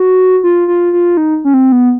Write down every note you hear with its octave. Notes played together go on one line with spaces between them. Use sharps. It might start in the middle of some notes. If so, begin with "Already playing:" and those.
Already playing: F#4
F4
F4
F4
D#4
C#4
C4
B3